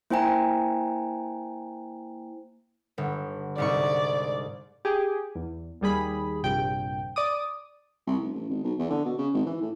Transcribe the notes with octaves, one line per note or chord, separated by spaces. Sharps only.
A#3 E4 C5 G5 G#5 A#5
G1
C2 G#2 D5 C#6
G4 G#4
E2
D#2 G3 G#4 B5
A#1 G2 C3 G5
D5 D6 D#6
C2
F1
A1
G#1
B1
E2
D3
B2
C#3
G#1
E3
A2